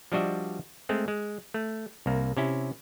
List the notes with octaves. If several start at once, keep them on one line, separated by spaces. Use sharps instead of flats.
F3 G3 D4 F#4 D#5 E5
G#3 A3 C4
G#3
A3
C2 A#3
C3 C#4 E4